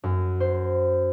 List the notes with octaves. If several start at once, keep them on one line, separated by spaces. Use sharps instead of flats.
F#2
C5